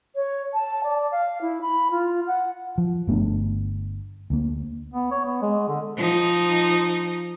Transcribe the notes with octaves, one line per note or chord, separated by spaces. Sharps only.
C#5
A5
D5
F5
E4
B5
F4
F#5
F3
G1 A3 B3 D4
D2 A#3
B3
C#5
B3
G#3
D3
F3 D#4